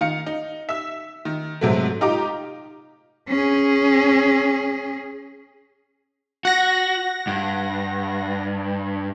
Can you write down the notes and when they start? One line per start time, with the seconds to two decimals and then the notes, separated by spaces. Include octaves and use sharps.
0.01 D#3 F5 C#7
0.26 D#4
0.69 E5 E6
1.25 D#3
1.61 G#2 C3 F#3 A3
2.01 D#4 F4 G4 D#5 A#5 D6
3.29 C#4 G#4
6.45 F#4 F#5 A#6
7.27 G2